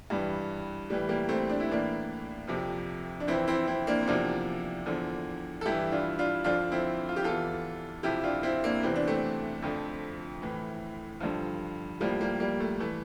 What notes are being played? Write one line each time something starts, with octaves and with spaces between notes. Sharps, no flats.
G2 E3 G3
A2 E3 G3
G3 A#3
A3 C4
D4
E4
A2 E3 A#3 D4
F2 C3 F3
D4
F2 E3 C4 E4
C4 E4
C4 E4
A#3 D4
C4
E2 C3 F3 A#3 D4
E2 D3 F3
A4
G2 E3 E4 G4
D4 F4
D4 F4
F2 D3 F3 D4 F4
C4 E4
F4
G4
E2 E3 F4 A4
F2 C3 F3 E4 G4
D4 F4
C4 E4
A#3 D4
E2 C3 E3 C4
D4
A3 C4
F2 D3 F3
A2 E3
G2 D3 F3
A2 F3 G3 A#3
G3 A#3
G3 A#3
A3
E3 A3